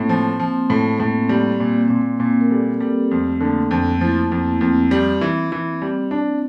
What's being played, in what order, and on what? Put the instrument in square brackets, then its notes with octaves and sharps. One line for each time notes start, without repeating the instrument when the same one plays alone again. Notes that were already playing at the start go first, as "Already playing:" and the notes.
Already playing: [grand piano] A2 [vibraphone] A#3 C4
[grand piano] F3
[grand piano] F3 [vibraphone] C4
[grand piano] A2 [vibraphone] C4
[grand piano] A2 [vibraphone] A#3
[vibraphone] C4
[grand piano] G3 [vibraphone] A#3
[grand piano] A#2
[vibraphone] A#3
[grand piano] A#2 [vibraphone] C4
[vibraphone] A#3
[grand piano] A#2 [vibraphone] C4
[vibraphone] A#4
[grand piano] G3 [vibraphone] A4
[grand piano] G3 [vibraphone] G4
[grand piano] F2 [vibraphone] A3
[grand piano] D3 [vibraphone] A#3
[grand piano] F2
[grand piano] F3 [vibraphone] E4
[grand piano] F2 [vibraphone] A#3
[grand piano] F2 [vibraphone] C4
[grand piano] G3
E3
E3
[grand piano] G3 [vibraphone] C4
[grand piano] D4